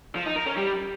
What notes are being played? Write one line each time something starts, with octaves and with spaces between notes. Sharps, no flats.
F3
D#4
A#4
C#4
G3